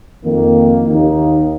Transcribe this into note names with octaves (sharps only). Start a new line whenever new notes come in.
F2 D#3 A#3
D#2 D#3 A#3 D#4